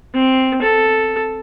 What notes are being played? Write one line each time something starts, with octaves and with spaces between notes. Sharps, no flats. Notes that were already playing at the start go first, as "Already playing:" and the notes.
C4
A4